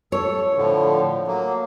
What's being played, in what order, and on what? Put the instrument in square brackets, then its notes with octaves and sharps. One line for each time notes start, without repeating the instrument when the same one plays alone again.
[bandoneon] A4 [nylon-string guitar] C#5
[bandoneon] A2 D3 F3
F#3 A#3